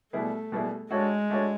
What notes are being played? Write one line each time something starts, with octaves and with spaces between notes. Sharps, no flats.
B2 G3 A3 B3 E4 G#4
B2 G3 B3 E4 G#4
G#3 A3 D4 F#4 A4 C#5
A3 D4 F#4 A4 C#5